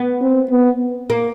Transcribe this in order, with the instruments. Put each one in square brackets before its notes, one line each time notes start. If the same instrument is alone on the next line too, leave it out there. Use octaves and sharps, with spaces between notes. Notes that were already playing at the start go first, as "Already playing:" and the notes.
Already playing: [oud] B3
[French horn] C4
B3
[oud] A#3